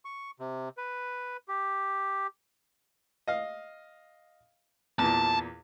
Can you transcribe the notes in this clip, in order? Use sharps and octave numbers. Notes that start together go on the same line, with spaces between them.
C#6
C3
B4
G4
D#5 F5
E2 A#2 A5